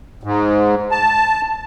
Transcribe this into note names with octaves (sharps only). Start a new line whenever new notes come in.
G#2
A5